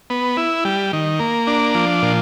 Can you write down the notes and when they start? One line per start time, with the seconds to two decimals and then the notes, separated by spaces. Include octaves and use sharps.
0.10 B3
0.37 E4
0.65 G3
0.93 D#3
1.20 A#3
1.47 D4
1.75 F3
2.02 A#2